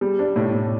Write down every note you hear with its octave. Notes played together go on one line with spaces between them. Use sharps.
G3
D4
A2
A2